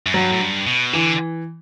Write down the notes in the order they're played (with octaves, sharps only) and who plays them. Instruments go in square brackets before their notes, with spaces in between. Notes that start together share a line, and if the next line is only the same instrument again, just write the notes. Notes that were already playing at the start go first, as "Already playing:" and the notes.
[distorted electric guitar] F#2
[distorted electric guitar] G2 [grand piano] F#3
[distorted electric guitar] A2
G2
B2
[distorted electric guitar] D3 [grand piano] E3